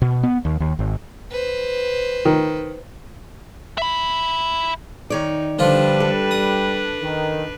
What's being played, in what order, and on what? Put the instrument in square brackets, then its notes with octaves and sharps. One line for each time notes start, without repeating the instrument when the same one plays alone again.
[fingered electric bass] B2
B3
D#2
D#2
G#1
[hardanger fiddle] B4 C5
[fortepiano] D#3
[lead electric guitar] E5 B5
[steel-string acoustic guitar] D#3 C#5 D5 [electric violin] D#4
[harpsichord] D3 F3 F4 [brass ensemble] G3 [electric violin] D4 B4
[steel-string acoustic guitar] A4
[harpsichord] D#6
[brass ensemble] D#3